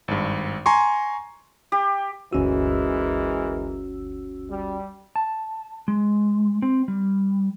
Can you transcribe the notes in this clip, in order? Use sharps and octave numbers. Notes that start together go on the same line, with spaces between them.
G#1 G2
G#5 A#5 C6 C#6
G4
G1 D2 E3 G#3 C#4 F#4 A#4 E6
G3
A5
G#3
C4
G3